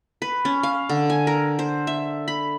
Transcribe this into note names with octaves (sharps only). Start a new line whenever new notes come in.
B4
C#4
F5
D3
G#5
A#4
C5
E5
B5